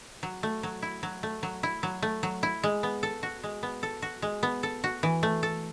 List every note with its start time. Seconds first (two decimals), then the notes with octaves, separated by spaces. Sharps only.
0.23 F#3
0.43 A3
0.63 F#3
0.82 E4
1.03 F#3
1.23 A3
1.43 F#3
1.63 E4
1.83 F#3
2.02 A3
2.23 F#3
2.43 E4
2.63 G#3
2.83 B3
3.03 A4
3.23 F#4
3.43 G#3
3.63 B3
3.83 A4
4.02 F#4
4.22 G#3
4.43 B3
4.63 A4
4.84 F#4
5.03 E3
5.23 A3
5.43 A4